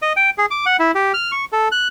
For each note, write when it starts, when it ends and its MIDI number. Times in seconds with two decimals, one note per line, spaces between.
0.02 0.13 75
0.16 0.30 79
0.38 0.46 68
0.51 0.65 86
0.66 0.77 78
0.79 0.91 64
0.95 1.12 67
1.14 1.31 89
1.32 1.45 85
1.52 1.68 69
1.72 1.88 90